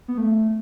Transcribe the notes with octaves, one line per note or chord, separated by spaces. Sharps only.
B3
A3